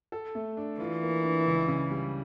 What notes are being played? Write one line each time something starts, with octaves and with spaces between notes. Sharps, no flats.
A4
A3
D4
E3 F4
A#3
D4
C#2
C#3
G3